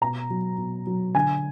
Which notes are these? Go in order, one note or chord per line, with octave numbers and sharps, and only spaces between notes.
B2 A#5
F#3
B2
F#3
D3 G#5